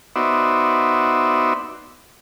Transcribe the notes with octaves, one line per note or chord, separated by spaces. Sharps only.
B3 D#4 F#4 C5 D5 E5